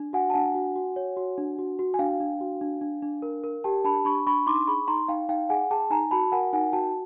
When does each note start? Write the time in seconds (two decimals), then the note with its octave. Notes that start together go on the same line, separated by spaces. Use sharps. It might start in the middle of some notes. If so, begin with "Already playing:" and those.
Already playing: D4
0.13 F#4 F#5 G#5
0.30 A5
0.34 D4 F#5 G#5
0.55 F#4
0.76 F#4
0.96 C#5
1.17 F#4
1.38 D4
1.58 F#4
1.79 F#4
1.94 G#5
1.99 D4 F5 G5
2.20 D4
2.41 F#4
2.61 D4
2.81 D4
3.02 D4
3.22 A#4
3.44 A#4
3.64 G4 G5 A5
3.84 D4 A5 B5
4.05 D4 B5 C#6
4.27 D4 B5 C#6
4.47 D#4 C6 D6
4.67 G#4 B5 C#6
4.88 D#4 A#5 C6
5.08 D#4 F5 G5
5.29 D#4 F5 G5
5.49 G#4 F#5 G#5
5.71 G#4 G5 A5
5.91 D#4 G#5 A#5
6.11 F#4 A5 B5
6.32 A#4 F#5 G#5
6.53 D#4 F#5 G#5
6.73 F#4 G5 A5